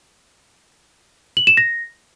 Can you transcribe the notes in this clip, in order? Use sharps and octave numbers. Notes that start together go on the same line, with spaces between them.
F#7
E7
A#6